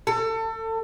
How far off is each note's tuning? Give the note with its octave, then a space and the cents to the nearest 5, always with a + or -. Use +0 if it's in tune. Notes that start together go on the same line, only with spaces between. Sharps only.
A4 +30